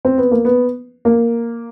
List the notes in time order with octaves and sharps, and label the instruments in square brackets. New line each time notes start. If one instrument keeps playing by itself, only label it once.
[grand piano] C4
B3
A#3
B3
A#3